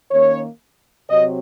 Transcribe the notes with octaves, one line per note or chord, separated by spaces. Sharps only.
D#3 A#3 C#4 C#5
C3 F#3 C4 D#5